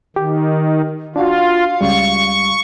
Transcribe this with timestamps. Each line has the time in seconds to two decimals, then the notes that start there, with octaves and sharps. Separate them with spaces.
0.16 D#3 G4
1.16 D4 F4 F#4 F5
1.81 C#2 C#3 G3 C#6